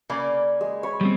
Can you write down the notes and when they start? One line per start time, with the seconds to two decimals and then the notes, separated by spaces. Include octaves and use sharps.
0.09 C#3 A#3 D5 G#5 B5
0.61 G#3
0.83 C#5 B5
1.01 G3 B3 C4